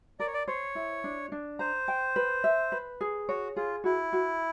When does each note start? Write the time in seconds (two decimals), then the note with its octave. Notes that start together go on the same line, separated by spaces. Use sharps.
0.20 A#4 D5
0.27 C#5
0.33 D5
0.48 C5 C#5
0.75 E4
1.04 D4
1.32 D4
1.59 C5 A#5
1.88 G5
2.16 B4
2.44 E5
2.72 B4
3.01 G#4
3.29 F#4 C#5
3.56 F4 G#4
3.84 E4 F#4
4.13 F#4